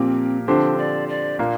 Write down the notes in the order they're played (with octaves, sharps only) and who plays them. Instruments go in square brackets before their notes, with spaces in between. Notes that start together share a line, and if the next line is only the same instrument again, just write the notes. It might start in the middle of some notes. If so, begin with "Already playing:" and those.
Already playing: [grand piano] A#2 F3 A#3 G4 [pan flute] C4
[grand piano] D3 F3 C4 G4 C5 [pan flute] D4
[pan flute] D5
D5
[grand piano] A#2 A#3 D4